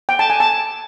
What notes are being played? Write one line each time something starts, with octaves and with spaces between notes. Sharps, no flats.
G5
A5
G#5
A5